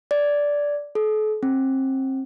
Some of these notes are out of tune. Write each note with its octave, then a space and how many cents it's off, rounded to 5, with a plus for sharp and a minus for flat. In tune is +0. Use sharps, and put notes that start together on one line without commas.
D5 -10
A4 -40
C4 +30